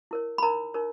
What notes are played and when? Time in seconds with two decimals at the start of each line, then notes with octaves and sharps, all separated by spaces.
0.11 E4 A#4 C#5
0.38 B5
0.42 D#4 A#4 C#5 A#5
0.74 D#4 A#4 C#5